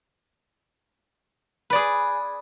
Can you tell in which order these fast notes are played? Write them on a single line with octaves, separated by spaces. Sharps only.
B4 D5 G#4